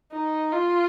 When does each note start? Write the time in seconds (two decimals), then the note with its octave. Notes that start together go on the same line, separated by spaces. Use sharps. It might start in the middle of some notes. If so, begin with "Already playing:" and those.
0.12 D#4
0.53 F4